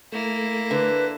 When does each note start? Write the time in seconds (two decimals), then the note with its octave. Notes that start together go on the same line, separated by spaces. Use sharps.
0.12 A3 A#3 E4
0.71 D3 B4